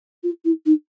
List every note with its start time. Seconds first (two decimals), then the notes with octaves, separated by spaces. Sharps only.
0.23 F4
0.45 E4
0.65 D#4